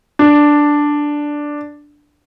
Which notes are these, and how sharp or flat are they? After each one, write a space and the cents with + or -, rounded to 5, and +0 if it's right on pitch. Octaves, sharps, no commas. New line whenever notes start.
D4 +0